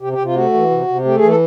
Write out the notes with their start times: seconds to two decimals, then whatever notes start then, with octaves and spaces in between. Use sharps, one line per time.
0.01 C3 G4
0.13 G4
0.18 C3
0.25 F4
0.35 A3 F#4
0.54 E3
0.71 C3
0.88 C3
1.05 A3 G4
1.17 G#4
1.22 E3
1.29 A4